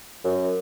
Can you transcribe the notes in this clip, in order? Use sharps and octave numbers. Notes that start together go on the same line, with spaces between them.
F#2